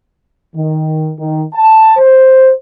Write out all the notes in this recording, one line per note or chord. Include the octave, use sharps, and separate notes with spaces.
D#3
D#3
A5
C5